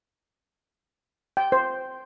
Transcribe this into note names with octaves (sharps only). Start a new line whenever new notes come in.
G5
C5